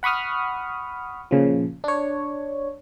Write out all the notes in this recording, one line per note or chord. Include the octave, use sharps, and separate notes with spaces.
F#5 B5 C#6 D#6 F6
A#2 C#3 F3
D4 C#5